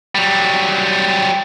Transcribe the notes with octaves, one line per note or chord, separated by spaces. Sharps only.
F#3 G3